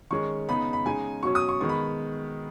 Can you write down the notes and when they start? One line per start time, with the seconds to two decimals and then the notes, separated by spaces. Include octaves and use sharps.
0.11 D#3 G#3 C#4 C#6
0.49 C#3 B3 D#4 B5
0.73 B5
0.85 C#3 G#3 D#4 G#5
1.23 B2 F#3 C#4 C#6
1.35 D#6
1.49 C#6
1.60 D#3 G#3 B3 C#6
1.69 B5